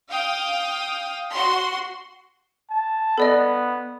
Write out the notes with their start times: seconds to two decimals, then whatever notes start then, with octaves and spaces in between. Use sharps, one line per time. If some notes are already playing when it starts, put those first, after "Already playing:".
0.10 F5 G5 D#6
1.32 F#4 C6
2.70 A5
3.18 B3 A4 D5 D#5